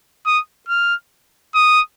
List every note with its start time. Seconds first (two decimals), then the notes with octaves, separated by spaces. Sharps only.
0.26 D#6
0.69 F6
1.55 D#6